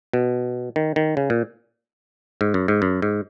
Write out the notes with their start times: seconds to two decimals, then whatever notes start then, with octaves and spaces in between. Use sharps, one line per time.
0.13 B2
0.76 D#3
0.96 D#3
1.17 C#3
1.30 A#2
2.41 G#2
2.54 F#2
2.68 G#2
2.82 F#2
3.02 G#2